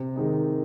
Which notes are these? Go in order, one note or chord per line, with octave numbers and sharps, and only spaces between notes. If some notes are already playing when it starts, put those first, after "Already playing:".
Already playing: C3
D#3 G#3 D#4